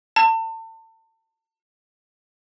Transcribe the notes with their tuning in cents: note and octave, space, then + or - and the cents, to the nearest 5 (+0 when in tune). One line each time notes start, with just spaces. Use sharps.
A5 +35